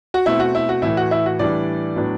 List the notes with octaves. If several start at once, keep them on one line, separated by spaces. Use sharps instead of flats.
F#4
B2 A3 C4 E4
F#4
E4
F#4
A2 E3 A3 E4
F#4
E4
F#4
A2 E3 G3 D4 D5
A2 F#3 B3 D4